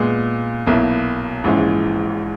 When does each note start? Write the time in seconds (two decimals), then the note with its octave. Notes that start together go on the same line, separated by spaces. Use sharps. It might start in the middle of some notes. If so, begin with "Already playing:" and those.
Already playing: A#2 G#3 B3
0.66 B1 B2 A#3 E4
1.44 A#1 G#2 E3 G#3 C#4